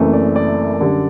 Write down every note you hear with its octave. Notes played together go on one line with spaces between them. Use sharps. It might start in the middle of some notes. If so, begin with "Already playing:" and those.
Already playing: F#1 F#2 E3 A3 C4
D5
D5
F#2 D3 G3